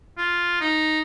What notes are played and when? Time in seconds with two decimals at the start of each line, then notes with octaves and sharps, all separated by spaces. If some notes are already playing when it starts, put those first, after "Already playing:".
0.18 F4
0.61 D#4